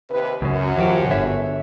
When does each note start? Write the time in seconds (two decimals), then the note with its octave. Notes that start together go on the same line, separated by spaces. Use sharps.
0.11 D#2 C3 B4
0.42 C#2 F#2 C#3
0.77 D#2 F3 F#4 G4
1.11 G1 D3 C#5 E5